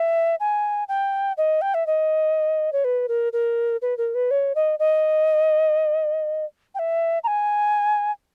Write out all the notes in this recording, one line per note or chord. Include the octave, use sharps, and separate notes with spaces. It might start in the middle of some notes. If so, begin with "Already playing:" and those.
Already playing: E5
G#5
G5
D#5
G5
E5
D#5
C#5
B4
A#4
A#4
B4
A#4
B4
C#5
D#5
D#5
G5
E5
A#5
G#5